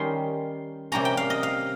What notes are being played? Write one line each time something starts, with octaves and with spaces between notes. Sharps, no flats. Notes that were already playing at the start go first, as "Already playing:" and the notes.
Already playing: D#3 G3 C#4 C6
C3 G3 A#3 C#4 A#5
G5
F5
D#5
F5